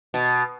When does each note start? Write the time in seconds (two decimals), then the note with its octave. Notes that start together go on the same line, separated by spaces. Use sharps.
0.14 B2